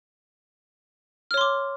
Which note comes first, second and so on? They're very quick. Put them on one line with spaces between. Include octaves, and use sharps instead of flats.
F6 C#5 C6 D6